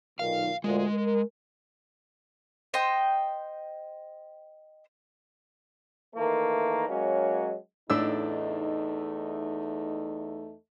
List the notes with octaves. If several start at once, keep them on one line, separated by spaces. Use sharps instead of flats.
B1 A#2 D#3 F5
D2 A#2 G#3
A#4
C5 D#5 G5
D#3 E3 A3 A#3
F#3 G#3 A#3 C#4
E2 A2 A3 D4 D#4 E6